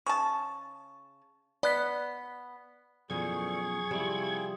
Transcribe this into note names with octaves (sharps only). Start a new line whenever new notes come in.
C#3 A5 C#6
B3 D5 F#6 B6
F#2 B2 D3 E3 F3 G#4 C#6 G#6
C3 F3 G3 C4 E4